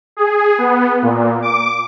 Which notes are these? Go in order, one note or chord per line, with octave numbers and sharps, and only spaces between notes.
G#4
B3
A#2
D6